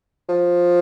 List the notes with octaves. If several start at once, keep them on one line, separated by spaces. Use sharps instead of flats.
F3